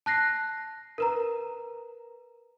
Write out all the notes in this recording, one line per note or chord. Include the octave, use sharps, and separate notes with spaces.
A5 F#6 A#6 C7
A#4 B4 A#5